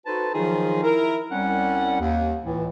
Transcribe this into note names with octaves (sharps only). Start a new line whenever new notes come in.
D#4 F#4 A4 B4 C5 A5
D#3 F3 F#3 D#4 F4 G#4
E4 A#4
C2 G3 C4 C#4 F#5
D#2
C#2 A2 E3